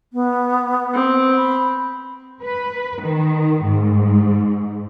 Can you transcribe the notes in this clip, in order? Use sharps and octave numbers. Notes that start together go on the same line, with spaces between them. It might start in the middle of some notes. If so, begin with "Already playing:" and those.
B3
C4
B5
B4
D#3
G#2